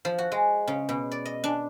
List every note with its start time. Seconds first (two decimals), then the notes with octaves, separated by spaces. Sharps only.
0.05 F3
0.18 F#4
0.32 G#3
0.68 C#3
0.89 B2
1.12 D5
1.25 D#5
1.44 D4